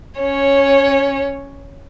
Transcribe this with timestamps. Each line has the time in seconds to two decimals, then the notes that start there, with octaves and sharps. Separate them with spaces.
0.20 C#4 C#5